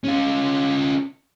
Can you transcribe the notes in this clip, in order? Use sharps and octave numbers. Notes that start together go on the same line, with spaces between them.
C#4 F4